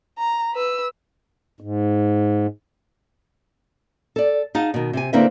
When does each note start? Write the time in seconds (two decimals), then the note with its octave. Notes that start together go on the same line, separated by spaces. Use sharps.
0.18 A#5
0.53 B4 E6
1.60 G#2
4.16 A4 D5
4.55 D#4 G#4 D#5 F5 F#5 A5
4.74 B2 D#3
4.93 C3 G4 G#5
5.13 D3 A#3 C4 E4 B4 E5